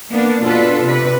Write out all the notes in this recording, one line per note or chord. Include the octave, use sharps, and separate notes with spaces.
A#3 B3 D4
B2 D4 F4 A4 B4
C3 B4